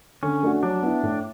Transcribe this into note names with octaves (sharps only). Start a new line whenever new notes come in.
D3 C#4
A3 D4 F#4
F#3 D4
B3 E4
A2